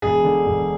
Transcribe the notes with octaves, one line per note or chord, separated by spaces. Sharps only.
E1 G#4
D3
E1